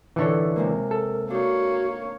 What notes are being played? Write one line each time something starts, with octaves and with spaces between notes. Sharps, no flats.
D3 E3 D#4 A4 C#5
C3 G#3 A#3 A#4
A4
A#3 D4 D#4 F#4 C#5